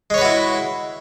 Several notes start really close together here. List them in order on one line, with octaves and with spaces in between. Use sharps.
G#3 C#5 B4 F#4 E4